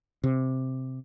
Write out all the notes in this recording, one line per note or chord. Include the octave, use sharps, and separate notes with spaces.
C3